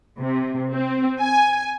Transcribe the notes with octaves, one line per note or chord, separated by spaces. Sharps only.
C3
C4
G#5